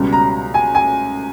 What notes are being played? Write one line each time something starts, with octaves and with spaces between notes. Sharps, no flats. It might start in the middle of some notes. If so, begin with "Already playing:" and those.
Already playing: C#2 B2 G3
A#5
G#5
G#5